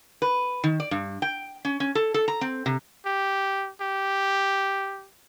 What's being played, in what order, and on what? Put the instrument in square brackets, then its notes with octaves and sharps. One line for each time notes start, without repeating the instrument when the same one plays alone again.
[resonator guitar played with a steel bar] B4
D#3
D5
G2
G5
C#4
C#4
A4
A4
A#5
C4
C3
[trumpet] G4
G4